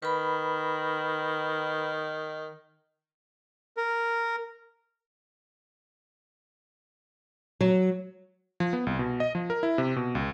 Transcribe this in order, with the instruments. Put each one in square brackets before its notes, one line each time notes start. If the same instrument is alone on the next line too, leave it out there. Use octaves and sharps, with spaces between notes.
[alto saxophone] D#3 [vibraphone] B4 B5
[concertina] A#4
[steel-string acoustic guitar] F#3
[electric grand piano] F3
B3
C2
B2
D#5
F3
A#4
E4
C3
B2
C#2